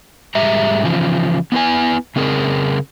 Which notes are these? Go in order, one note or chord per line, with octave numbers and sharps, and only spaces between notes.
G#2 G3 G#4 E5 A#5
C#3 E3 F3
B3 E4 B4 G#5
C#3 C4 G#4 A#4